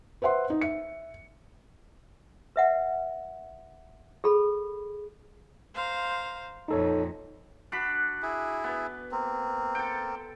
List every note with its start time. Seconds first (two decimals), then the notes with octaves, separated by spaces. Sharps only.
0.22 B4 C5 E5 F#5 C6
0.50 D#4
0.61 E5 C#7
2.56 B4 E5 F#5
4.24 G#4 A4 B5
5.74 C5 F5 A#5
6.68 F2 A#2 D#4 A4 C#5
7.72 D4 F#4 B5
8.22 E4 G#4
8.64 B3
9.12 A#3 C4
9.75 A4 G5